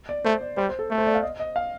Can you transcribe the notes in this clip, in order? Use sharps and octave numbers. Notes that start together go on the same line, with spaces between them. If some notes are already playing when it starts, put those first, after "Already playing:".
D5
A3 C5
D5
G3 C5
C5
A4
A3
C5
D5
F5
D#5
D#5
F5